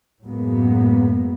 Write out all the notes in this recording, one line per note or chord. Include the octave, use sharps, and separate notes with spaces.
F#2 A2 F#3 G#3 A#3 B3